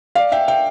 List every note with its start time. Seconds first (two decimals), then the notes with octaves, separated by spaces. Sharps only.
0.15 D5 F5
0.32 E5 G5
0.48 E5 G5